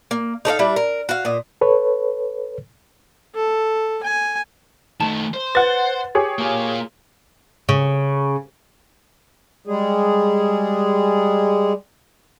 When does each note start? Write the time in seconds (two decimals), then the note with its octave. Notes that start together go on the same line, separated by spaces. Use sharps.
0.11 A#3
0.45 D#4 A4 D5 F5
0.59 G3 D4 E4
0.76 A#4
1.09 F#4 F5
1.25 A#2 D#5
1.61 A4 B4 C#5
3.35 A4
4.03 G#5
5.01 D#3 A3 A5
5.34 C5
5.55 B4 F#5 A6
6.15 G4 G#4 C#5
6.39 A#3 F4
7.69 C#3
9.67 G3 G#3 G#4